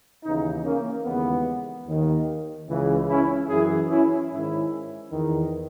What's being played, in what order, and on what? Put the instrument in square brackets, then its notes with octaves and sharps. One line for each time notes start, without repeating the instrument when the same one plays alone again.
[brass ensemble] D#2 C#3 E3 B3 D#4
A#3 C#4
D#2 C#3 E3 G#3 B3
D#2 D#3
C#2 C#3 E3
C#4 E4
F#2 E3 E4 G#4
C#4 E4
G#2 D#3 C#4 E4
E2 D#3